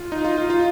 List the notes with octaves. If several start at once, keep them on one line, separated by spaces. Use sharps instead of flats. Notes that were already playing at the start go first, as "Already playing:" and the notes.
Already playing: F4
D#4
F4
F4
F4